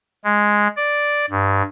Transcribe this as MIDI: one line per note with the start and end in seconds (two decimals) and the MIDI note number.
0.24 0.68 56
0.77 1.26 74
1.30 1.62 43